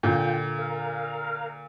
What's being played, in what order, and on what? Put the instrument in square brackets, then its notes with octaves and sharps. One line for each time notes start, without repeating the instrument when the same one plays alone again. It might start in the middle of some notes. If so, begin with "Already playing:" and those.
[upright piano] A#2 D3 [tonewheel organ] F4 G5
[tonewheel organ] A#4 F5